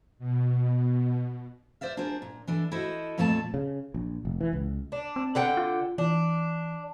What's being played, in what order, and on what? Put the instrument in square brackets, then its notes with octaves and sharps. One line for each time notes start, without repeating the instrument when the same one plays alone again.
[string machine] B2
[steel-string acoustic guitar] C5 D5 E5 F5
D4 F4 G#4 A#4 C5
A#2
E3 D4 A4
E4 F#4 A4 C5 D#5
F2 A#2 A3 F4 A4 A5
[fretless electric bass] C#3
A#1
F1
E3
C#2
[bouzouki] D4
[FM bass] C4
[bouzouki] D3 F#5 G5
[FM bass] F4
[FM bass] E3 [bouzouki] D4